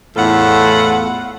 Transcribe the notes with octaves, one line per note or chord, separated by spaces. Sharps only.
E2 A2 F4 A4 F#5